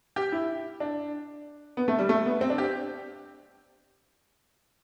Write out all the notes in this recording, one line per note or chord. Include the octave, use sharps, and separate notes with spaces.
G4
E4
D4
B3
A3
G3
A3
B3
C4
D4
G4